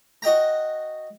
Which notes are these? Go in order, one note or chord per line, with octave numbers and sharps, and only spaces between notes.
F#4 D#5 G5 A#5